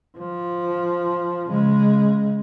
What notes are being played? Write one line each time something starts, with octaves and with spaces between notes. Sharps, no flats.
F3
C#3 G#3